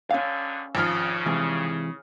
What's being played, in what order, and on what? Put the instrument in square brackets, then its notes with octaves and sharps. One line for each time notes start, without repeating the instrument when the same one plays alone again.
[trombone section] D#2 A#2 D3 [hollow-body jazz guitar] C#4 F5
[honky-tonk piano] G#1 F3 F6 [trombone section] C#3
[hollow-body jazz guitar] C3 E3 G#3